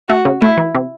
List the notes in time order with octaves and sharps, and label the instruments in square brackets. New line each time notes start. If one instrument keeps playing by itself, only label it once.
[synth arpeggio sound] A3 [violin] F#4
[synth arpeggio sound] C#3
[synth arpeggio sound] A3 [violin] E4
[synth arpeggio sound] E3
C3